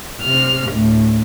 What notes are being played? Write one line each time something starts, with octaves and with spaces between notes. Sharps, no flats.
C3 F6
D2 A2